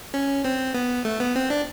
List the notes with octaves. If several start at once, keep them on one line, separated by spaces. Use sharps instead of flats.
C#4
C4
B3
A3
B3
C4
D4